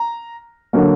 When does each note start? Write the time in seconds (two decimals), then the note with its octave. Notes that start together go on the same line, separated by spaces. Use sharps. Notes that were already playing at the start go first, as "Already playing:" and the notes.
Already playing: A#5
0.73 D3 F#3 A#3